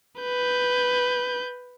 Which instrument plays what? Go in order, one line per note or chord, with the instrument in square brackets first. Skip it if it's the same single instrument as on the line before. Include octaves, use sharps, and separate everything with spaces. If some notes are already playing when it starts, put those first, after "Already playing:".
[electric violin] B4 G6